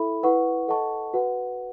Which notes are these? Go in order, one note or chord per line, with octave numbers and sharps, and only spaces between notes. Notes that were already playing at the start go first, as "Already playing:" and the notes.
Already playing: E4 A4 E5 B5
E4 B4 F#5 C#6
A4 D#5 F#5 A5 C#6
F#4 B4 F#5